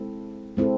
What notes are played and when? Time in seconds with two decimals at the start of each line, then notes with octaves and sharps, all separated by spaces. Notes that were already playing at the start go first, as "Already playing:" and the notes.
Already playing: G#3 C4 E4 A4
0.57 G#3 C4 E4 A4